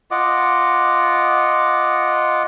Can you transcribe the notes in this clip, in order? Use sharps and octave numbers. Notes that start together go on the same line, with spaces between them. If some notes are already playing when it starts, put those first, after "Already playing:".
F4 D#5 F#5 D6